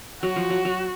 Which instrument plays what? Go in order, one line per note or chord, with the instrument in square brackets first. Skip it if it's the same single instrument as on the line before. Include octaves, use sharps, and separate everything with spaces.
[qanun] F#3 [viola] F#4
[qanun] F3
F#3
F#3